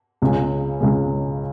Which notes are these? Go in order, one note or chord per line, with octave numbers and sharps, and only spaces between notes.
C#2 C#3 G#3
C#2 C#3 G#3